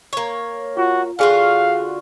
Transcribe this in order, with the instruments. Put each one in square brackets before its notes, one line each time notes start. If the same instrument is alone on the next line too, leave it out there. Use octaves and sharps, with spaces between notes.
[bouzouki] A#3 C#5
[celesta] F4 [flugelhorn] F#4
[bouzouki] D3 F4 F#4 [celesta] G#4 G#5 F6 [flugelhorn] F5